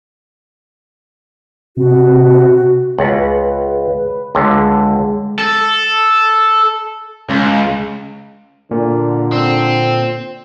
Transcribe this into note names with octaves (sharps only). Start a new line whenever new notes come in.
C3 F#4
C#2 B4 F#5
C#2 D3 G#3
A4
C#2
A#2 D3
C4